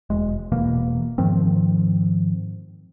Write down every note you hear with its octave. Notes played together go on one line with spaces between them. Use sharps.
E1 G#3
E1 B2 E3 A#3
G#2 D#3 F3 C4